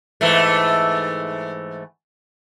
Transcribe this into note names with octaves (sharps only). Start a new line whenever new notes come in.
G#2 E3 A3